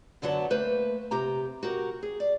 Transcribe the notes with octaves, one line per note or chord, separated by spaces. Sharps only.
F#2 D3 F#3 B3 A5
A3 A#3 B4 C5
C3 G4 A#5
F#4 G4 A#4
G#4
D5